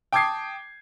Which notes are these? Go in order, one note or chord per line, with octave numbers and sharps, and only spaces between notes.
G5 A5 D6 D#6 G#6 C7